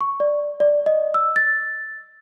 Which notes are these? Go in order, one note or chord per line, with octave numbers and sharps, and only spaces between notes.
C#6
D5
D5
D#5
E6
A6